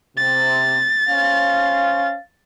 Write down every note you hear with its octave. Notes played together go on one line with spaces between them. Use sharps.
C3 A6
C#4 C5 F5